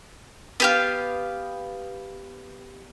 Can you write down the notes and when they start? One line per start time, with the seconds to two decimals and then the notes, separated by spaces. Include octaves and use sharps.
0.60 B3 G4 F5